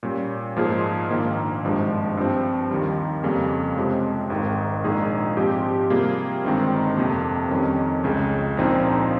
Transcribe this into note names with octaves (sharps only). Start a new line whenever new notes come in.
A#2 G3 C#4
G#2 F3 A#3 F4 G#4
A#1 G#2 D#3 A#3
G#1 G2 F3 G#3
G2 F3 C4
D#2 D#3 G3
F2 C#3 G3 A#3 C#4
C3 F3 G#3
G#1 G#2 D#3
A#1 A#2 G#3 D#4 G#4
G#2 F3 C4 G4
C3 G3 A#3 F4 G#4
G1 G2 D#3 G#3 C4
F2 C3 F3 A#3
F2 D#3 G3 C#4
C#2 C#3 G#3
A#1 A#2 F3 C4 D#4